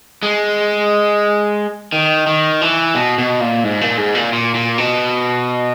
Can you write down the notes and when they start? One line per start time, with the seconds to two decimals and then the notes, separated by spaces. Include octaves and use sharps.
0.23 G#3
1.93 D#3
2.27 D#3
2.61 E3
2.95 B2
3.18 B2
3.40 A#2
3.64 G#2
3.81 A#2
3.98 G#2
4.15 A#2
4.33 A#2
4.55 A#2
4.78 B2